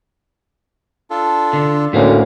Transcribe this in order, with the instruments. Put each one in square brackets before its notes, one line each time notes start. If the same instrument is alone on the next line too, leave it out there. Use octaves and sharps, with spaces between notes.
[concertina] D4 F4 A4
[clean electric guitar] D3
[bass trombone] D2 [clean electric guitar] A2 A#3 C#4